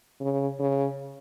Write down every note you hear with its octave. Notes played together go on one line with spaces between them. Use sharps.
C#3
C#3